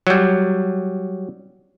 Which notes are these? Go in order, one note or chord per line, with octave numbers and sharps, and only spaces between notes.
F#3 G3